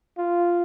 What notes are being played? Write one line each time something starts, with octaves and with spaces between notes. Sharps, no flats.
F4